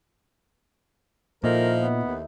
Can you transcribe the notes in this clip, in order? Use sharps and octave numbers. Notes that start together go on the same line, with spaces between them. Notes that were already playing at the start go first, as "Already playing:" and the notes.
A#2 F3 D#4 E4 A4 A#4
B3
D#2